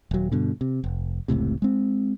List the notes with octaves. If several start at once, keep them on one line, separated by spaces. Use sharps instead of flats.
D#1 F#3
G2 B2 D3
C3
F1
F1 C#2 A2 C3
G#3 C4